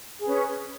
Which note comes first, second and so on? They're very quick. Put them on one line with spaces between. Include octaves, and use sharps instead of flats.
G#4 B4 C#4